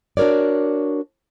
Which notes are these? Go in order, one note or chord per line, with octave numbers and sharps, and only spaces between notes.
D4 F#4 A#4 C#5 D5